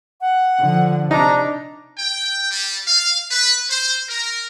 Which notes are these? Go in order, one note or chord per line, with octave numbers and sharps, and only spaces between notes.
F#5
D3 F3
C3 D4 D#4 A#5
G5
G3
F5
B4
C5
A#4